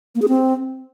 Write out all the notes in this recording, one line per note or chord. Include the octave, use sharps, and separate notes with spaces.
A#3
G#4
C4